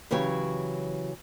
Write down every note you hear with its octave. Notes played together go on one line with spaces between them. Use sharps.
C#3 E3 F#3 G4 C#5